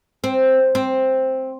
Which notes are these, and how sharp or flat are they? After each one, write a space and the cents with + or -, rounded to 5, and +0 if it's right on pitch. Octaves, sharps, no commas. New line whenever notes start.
C4 +5
C4 +5